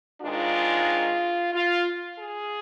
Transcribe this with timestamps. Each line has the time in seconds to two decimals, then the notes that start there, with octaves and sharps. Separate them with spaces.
0.21 G#2 D#3 G#3 D4 F4
1.53 F4
2.20 G#4